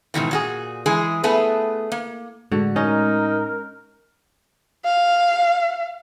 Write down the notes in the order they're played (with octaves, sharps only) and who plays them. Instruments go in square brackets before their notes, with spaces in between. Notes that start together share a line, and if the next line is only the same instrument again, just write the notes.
[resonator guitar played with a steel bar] G#2 B2 D#3 E3
A#2 F#4 G#4
E3 G#3 G#4
A3 B3 G#4 B4 A5
A#3
[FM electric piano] A2 G#3 [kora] D3 F#4
[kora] C#4 D#5 [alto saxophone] D#4 [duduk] A#4
[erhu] F5